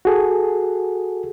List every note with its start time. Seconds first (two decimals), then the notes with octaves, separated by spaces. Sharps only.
0.05 F#4 G#4 A4